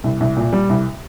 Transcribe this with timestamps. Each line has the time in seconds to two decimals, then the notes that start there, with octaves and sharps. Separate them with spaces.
0.04 C2
0.20 C2
0.37 A#2
0.53 G3
0.69 C2